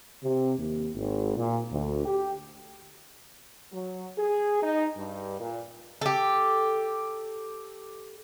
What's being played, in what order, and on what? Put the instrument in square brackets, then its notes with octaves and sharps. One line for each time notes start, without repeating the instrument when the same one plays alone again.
[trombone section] C3
D#2
G#1
A#2
D2
G4
[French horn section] F#3
G#4
D#4
G2
A#2
[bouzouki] G4 A4